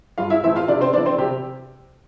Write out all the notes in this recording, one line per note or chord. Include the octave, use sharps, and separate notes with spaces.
G2 F4 F5
E4 E5
E3 A3 C4 E4 E5
F4 F5
C3 D4 D5
C4 C5
E3 B3 D4 D5
C4 C5
C3 G4